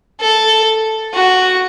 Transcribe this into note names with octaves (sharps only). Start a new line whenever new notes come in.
A4
F#4